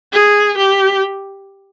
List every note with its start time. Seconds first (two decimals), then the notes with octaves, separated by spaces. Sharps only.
0.12 G#4
0.57 G4